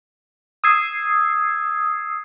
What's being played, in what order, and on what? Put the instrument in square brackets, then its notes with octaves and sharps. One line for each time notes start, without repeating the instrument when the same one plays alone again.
[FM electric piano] D#6 E6 G#6 C7